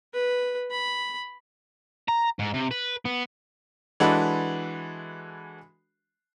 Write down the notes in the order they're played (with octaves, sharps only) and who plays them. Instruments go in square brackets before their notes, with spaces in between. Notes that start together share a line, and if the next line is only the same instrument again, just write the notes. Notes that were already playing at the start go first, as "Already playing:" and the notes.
[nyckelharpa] B4
B5
[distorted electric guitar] A#5
G#2
C3
B4
B3
[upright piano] E3 G#3 D4 F#4 A4 B4